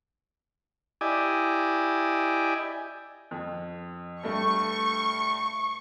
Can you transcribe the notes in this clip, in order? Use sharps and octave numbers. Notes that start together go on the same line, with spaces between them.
E4 G4 D5 D#5 G#5
F2
G2 A3 C#6